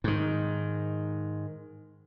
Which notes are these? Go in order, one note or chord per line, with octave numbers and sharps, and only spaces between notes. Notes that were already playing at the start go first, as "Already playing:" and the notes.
G#2 D#3